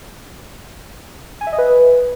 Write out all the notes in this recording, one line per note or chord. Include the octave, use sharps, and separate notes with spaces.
G#5
E5
D#5
B4